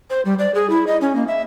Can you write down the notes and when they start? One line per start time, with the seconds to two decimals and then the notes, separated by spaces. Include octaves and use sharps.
0.10 C5
0.25 G3
0.39 D5
0.55 G#4
0.70 E4
0.87 D#5
1.01 C#4
1.15 A#3
1.27 E5